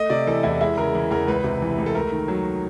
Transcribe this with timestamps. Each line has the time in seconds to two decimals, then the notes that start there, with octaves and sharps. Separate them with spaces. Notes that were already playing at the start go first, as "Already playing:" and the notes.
Already playing: A3 D#5
0.10 C3 D5
0.27 E3 A4
0.43 E2 E4
0.61 G#3 E4
0.77 C#3 A#4
0.95 E3
1.11 E2 A#4
1.27 C#2 B4
1.44 C3
1.62 E3
1.78 C#2
1.86 A4
1.95 A3 A#4
2.12 D#3
2.28 F#3